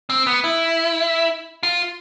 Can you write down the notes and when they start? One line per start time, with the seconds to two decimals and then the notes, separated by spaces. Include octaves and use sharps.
0.10 C4
0.27 B3
0.44 E4
1.63 F4